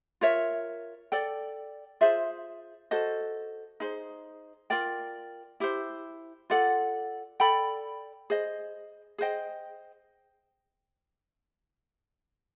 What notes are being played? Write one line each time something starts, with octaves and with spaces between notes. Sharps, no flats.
F4 A#4 C#5 E5
A4 D5 G5
F4 G#4 C5 E5
F#4 A4 C5 D#5
D#4 G#4 C5
F4 A#4 D5 G5
E4 G4 C5
F4 A4 D5 F#5
A4 D5 G5 B5
G#4 C5 D#5
G#4 C5 D#5 G5